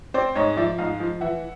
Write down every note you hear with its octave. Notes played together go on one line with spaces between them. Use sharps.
C4 C5 D5
G#2 C#5 D#5
F3 D5 E5
G#2 D#5 F5
F3
E3 E5 F#5